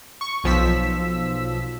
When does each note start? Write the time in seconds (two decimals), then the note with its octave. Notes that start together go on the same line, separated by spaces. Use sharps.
0.21 C#6
0.44 B1 F3 E6 B6